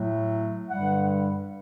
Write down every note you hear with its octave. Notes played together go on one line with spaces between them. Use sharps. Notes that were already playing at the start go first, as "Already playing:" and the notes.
Already playing: A2 F#3 A3
G2 D3 G3 F#5